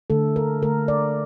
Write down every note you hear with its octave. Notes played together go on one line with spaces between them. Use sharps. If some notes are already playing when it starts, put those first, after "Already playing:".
D3 A3 A4
A#4
D3 A3 A#4
D5